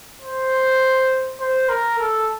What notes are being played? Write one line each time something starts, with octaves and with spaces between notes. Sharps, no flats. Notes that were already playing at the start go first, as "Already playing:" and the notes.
C5
C5
A#4
A4